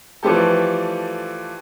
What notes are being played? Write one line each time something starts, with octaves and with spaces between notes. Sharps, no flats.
E3 F3 G3 A3 G4 A4